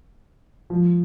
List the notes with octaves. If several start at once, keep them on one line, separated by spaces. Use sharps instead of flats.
F3